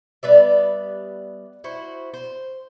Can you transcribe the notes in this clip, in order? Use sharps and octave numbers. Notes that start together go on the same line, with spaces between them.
G3 B3 D5 E5
E4 F#4 C5
C5